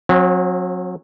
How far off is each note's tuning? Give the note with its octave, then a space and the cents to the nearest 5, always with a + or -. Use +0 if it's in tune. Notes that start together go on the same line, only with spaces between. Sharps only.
F#3 -30 C4 +35